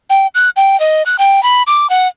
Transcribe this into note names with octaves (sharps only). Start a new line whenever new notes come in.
G5
F#6
G5
D#5
F#6
G5
B5
D6
F#5